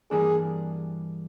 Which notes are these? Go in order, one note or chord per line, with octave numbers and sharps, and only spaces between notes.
G2 E3 G3 A#3 D4 G#4